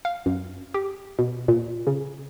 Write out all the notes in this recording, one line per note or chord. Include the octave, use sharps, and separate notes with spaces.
F5
F#2
G4
B2
A#2
C#3